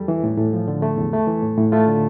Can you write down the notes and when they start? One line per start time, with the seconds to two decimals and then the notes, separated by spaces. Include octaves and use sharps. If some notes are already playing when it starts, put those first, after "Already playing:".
Already playing: E2 G3 A4
0.08 E3
0.24 A2
0.37 A2
0.53 F3
0.68 D3
0.82 A3
0.97 E2
1.13 A3
1.27 E3
1.42 A2
1.58 A2
1.72 A3 F4
1.87 D3